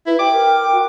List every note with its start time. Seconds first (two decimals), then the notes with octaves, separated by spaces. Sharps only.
0.06 E4 B4
0.19 G4 G5 D6
0.31 A#4
0.72 F#4